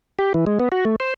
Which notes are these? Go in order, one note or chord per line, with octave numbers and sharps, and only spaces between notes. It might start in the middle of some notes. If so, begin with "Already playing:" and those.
G4
E3
G#3
B3
F#4
A3
C5